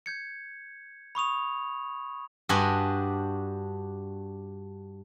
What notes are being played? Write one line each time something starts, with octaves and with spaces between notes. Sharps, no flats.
G6 G#6 C#7
B5 C#6 D#6 F7
G2 D4 F#4 G4 D#5 G#5